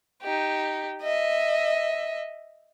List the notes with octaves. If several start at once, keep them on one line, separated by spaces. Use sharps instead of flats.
D#4 G4
D#5 E5